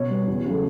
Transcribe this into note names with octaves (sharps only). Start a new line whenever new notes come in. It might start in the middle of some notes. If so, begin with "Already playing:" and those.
Already playing: B2 C#5
G3 B3
E2
C#3 F#3 A3